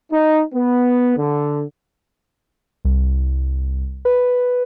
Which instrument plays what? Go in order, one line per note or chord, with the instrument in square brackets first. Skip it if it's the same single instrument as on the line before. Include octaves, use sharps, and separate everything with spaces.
[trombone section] D#4
B3
D3
[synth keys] C2
B4